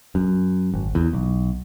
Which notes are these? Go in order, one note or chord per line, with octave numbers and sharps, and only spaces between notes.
F#2
G#1
E2
B1